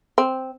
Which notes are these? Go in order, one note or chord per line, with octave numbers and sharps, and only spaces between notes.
C4